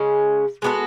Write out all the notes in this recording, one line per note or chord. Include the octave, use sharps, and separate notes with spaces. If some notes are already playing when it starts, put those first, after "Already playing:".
Already playing: C#3 G#3 C#4
G#3 B3 F#4 A4